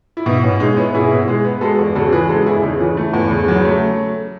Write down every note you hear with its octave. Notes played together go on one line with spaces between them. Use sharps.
E4
B2 D#4
B2 C#4
G#3 D#4
B3 C#4 E4
B2 E4 G#4
B2
G#3
B3
G#3 F#4 A4
E2
C#3 F#4 A4
E3 G#4 B4
G#3 F#4 A4
E2 E4 G#4
C#3 D#4
E3 C#4
A3
E2
C#3
F#3
A3 C#4